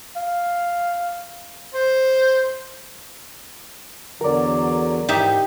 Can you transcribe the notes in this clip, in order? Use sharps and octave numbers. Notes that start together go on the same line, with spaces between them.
F5
C5
E2 D3 F#3 A#4 D5
G#2 E3 D#4 G4 E5